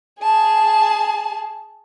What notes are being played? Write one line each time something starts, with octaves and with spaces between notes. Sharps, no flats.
G#4 A5